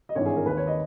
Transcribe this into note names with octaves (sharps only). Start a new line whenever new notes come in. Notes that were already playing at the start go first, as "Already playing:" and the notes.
D#5
G#1 G2 E3 C#5
G#4
A#4
D#2 D#3 B4
C#5
D#5